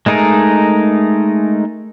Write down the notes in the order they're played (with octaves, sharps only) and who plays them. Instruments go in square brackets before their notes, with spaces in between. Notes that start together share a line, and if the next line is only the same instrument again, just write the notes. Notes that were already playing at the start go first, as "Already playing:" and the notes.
[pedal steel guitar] G#3 A3 D#4 G#4 A#4